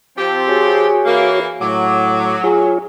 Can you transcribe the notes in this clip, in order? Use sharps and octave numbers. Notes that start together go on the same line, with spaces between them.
F3 C4 G4
F#4 G#4 C#5
E3 A#3
A2 F#3 D6
F4 G#4 C#5